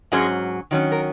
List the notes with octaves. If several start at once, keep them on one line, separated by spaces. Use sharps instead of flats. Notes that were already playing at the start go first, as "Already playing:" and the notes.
G#2 F#3 G#3 C#4 G#4
D#3 F#3 C#4
A#4